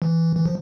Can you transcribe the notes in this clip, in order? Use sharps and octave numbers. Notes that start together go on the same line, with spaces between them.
E3
E3
F3